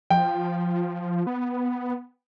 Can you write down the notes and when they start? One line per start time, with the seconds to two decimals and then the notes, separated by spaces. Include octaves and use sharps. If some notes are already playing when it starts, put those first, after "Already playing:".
0.10 F3 G5
1.27 B3